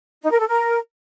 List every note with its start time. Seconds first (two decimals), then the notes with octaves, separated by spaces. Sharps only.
0.22 D#4
0.31 A#4
0.39 A4
0.48 A#4